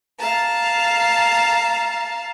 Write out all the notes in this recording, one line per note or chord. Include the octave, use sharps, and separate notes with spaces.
F5 A5 A#5